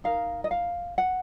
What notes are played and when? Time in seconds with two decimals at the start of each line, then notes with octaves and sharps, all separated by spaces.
0.04 D#4 A#4 F5
0.44 D#5
0.51 F5
0.98 F#5